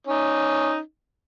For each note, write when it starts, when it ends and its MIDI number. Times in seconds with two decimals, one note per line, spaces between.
0.07 0.79 61
0.07 0.79 63